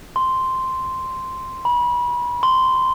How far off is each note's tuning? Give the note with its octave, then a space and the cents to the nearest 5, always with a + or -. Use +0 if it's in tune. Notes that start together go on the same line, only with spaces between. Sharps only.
C6 -5
B5 -30
C6 -10